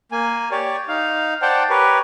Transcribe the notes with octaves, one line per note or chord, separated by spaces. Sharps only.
A#3 G#5
G4 C#5 D5
D#4 F5
C5 D5 F#5 G5 A5
G4 A#4 B4 C#5